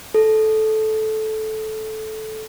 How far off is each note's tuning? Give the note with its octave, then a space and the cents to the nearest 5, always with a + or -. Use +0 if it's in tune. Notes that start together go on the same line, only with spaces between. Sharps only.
A4 -15